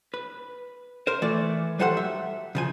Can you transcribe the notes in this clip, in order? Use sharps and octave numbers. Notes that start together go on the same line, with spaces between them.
B4
A#4 C5
E3 A3 D5
F#3 G3 A4 C5 D5 F#5
E5
C#3 F3 G#5